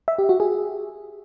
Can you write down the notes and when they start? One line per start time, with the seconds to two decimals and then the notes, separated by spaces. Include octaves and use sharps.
0.08 E5
0.19 G4
0.29 F#4
0.40 G#4